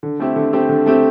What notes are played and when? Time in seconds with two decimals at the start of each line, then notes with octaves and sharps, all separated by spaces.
0.03 D3
0.20 A3 C4 E4 G4
0.36 D3
0.53 A3 C4 E4 G4
0.69 D3
0.86 A3 C4 E4 G4